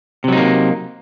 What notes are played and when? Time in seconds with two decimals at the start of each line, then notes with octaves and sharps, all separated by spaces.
0.24 C3
0.28 F#3
0.33 D#4
0.37 A#3